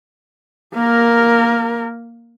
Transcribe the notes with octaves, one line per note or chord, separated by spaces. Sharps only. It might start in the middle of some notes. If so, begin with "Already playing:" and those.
A#3 A#4